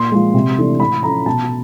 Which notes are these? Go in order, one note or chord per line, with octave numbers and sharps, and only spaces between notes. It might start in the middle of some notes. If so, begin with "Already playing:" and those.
Already playing: A#2 C6
F3 G#3
C3
E3 A3 D4
A2 B5
F3 A3 C#4 A#5
B2 A5